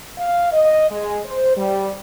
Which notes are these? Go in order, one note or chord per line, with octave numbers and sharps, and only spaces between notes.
F5
D#5
G#3
C5
G3